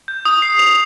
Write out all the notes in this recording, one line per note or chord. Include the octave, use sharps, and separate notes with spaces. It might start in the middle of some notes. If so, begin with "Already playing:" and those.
G6
D#6
C7
F7